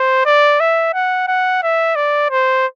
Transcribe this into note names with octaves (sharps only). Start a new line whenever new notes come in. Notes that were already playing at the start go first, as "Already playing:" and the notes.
Already playing: C5
D5
E5
F#5
F#5
E5
D5
C5